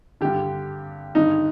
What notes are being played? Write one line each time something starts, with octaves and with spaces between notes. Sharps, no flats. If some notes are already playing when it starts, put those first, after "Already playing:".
G2 D3 G4
G2 D3 D#4